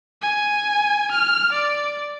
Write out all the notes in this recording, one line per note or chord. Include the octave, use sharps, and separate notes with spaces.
G#5
F6
D5